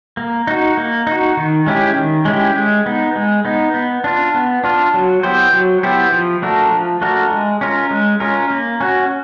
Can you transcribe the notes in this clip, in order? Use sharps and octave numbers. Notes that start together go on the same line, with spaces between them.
A#3
D#4 F#4
A#3
D#4 F#4
D#3
G#3 C#4 E4 G4
D#3
G#3 C#4 E4 G4
G#3
B3 D#4
G#3
B3 D#4
B3
D4 F4
B3
D4 F4
F#3
B3 E4 G4 C5
F#3
B3 E4 G4 C5
F3
A3 D4 F#4 A#4
F3
A3 D4 F#4 A#4
G#3
C#4 F4 A#4
G#3
C#4 F4 A#4
A#3
C#4 F#4